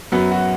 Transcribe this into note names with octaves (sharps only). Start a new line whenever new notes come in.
F#2 F#3 B3
F#4